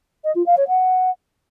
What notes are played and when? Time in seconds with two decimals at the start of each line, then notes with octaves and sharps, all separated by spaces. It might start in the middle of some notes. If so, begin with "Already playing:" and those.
0.24 D#5
0.35 F4
0.46 F5
0.57 C#5
0.68 F#5